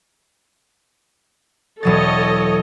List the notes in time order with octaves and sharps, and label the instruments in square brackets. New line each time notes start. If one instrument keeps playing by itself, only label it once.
[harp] E1 F#3 A6 [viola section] A4 C#5 D#5